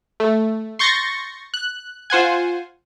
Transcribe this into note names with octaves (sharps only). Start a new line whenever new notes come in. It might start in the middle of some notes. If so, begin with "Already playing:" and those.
A3
C6 C#6 G6 A6 A#6 C#7
F#6
F4 C5 F#5 G#5